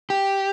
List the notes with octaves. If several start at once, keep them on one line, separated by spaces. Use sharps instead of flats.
G4